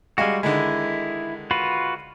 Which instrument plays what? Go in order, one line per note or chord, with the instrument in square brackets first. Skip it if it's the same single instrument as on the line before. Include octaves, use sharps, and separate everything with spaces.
[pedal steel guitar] G3 F#4 [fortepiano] G#3 F5 G#5
[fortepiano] D3 D#3 G#3 [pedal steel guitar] E4
[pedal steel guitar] F4 F#4 B4